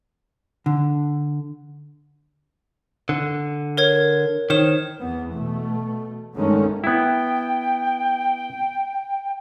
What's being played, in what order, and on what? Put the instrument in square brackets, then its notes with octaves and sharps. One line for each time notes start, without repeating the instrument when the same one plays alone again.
[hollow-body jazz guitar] D3
[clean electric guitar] D3
[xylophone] A#4 C#5 G#6
[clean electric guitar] D#3 [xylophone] C5 C#5 E7
[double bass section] E2 E3 B3
B2 A3
G1 D3 D#3 G#3 A3 C#4
[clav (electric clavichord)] B3 E4 [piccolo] G5